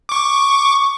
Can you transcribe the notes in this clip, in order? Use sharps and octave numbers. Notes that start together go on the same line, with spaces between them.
C#6 D6